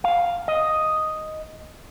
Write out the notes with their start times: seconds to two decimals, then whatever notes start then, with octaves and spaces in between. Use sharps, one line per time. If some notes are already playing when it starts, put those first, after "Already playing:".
0.04 F5
0.48 D#5